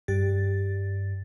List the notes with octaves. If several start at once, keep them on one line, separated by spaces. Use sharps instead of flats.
G2 G4 A6